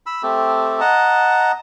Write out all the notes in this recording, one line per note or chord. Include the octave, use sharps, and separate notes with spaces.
B5 E6
A3 C4 G4 A4
D#5 F#5 A5 A#5